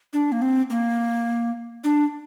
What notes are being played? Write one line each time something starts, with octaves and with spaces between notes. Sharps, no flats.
D4
A#3
C4
A#3
D4